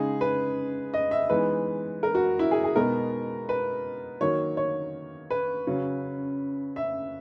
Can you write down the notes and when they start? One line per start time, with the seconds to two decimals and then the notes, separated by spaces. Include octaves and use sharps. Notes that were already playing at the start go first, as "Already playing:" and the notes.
Already playing: C#3 G#3 D#4 G#4
0.21 B4
0.94 D#5
1.11 E5
1.30 E3 G#3 B3 D#4 B4
2.03 A#4
2.15 F#4
2.39 E4
2.51 G#4
2.64 G#4
2.76 B2 G#3 B3 D#4 A#4
3.49 B4
4.21 D#3 F#3 A#3 C#5
4.57 C#5
5.30 B4
5.67 C#3 F#3 C#4
6.76 E5